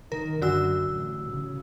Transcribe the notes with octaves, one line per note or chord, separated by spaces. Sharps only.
D#3 A#4
F#2 D3 F#4 E6
A1
C#3